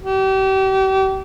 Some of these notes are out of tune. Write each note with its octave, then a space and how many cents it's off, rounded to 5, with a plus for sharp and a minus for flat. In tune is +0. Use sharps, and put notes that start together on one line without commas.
G4 -35